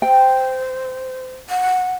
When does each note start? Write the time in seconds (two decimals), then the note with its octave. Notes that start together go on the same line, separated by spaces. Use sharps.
0.02 C5 G5
1.50 F#5